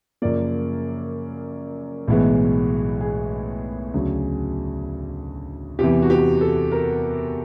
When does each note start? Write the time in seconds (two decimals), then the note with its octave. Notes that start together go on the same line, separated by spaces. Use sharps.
0.22 F#2 C#3 F3 A#3 D5
2.08 B1 A2 E3 G#3 B3
3.00 G#4
3.94 D2 C#3 F#3
5.79 E2 C3 E3 G4
6.02 F#4
6.10 G4
6.41 A4
6.72 A#4